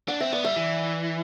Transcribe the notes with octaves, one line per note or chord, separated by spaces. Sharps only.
D4 F#5
C4 E5
B3 D5
G3 E5
E3